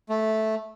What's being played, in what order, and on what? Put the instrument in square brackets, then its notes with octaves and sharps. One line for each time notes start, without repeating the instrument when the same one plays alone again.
[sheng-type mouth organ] A3